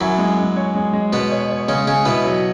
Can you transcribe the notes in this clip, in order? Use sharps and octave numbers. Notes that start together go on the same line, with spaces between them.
F#2 F#3 E4
G#3
G#3
C#5
G#3
G#3
B2 G#3 B3
C#5
C#5
C#3 G#3 C#4
C#3 G#3 C#4
B2 B3 E4
F#3